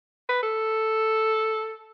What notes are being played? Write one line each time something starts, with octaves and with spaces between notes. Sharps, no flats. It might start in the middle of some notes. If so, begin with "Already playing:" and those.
B4
A4